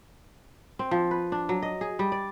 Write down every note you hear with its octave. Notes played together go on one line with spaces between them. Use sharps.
C4
F3
B4
D4
F#3
D#5
G#4
G3
D5